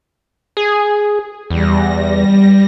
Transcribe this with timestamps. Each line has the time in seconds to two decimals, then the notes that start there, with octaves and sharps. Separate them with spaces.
0.57 G#4
1.50 E2 G3 A#6